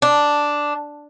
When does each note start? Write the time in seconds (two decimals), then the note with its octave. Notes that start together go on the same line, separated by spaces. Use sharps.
0.02 D4